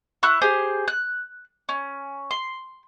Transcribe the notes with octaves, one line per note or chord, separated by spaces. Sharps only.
E4 C#6 F#6
G4 G#4 C5
F#6
C#4
C6